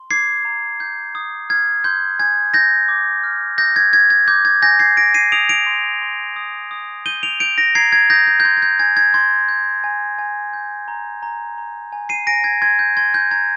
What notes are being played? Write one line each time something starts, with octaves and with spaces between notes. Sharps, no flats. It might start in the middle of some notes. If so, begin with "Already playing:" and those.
Already playing: C6
D6 G#6 C7
A#5
G6
D#6
F6 G#6
C6 G6
G#5 G#6
G6 A#6
D6
F6
D#6 G6 A#6
G#6
G6 G#6
G#6
D6 G6
G#6
G#5 G6 A#6
G#6 C7
G6 A#6 D7
C7 D#7
D#6 D7 F7
D7 F7
C6
C6
D#6
D#6
G6 D#7 G7
D7 F7
G6 D7 F7
A#6 D7
A#5 G#6 C7
G#6
D#6 G6 A#6
G6
G6
C6 G#6
G#6
G6
G#5 G#6
G#6
C6 G#6
G6
G#5
G#5
G6
A#5
A#5
A#5
G#5
C7 D#7
G#5 A#6 D7
G#6
C6 G#6
G6
C6 G#6
G6
A#5 G#6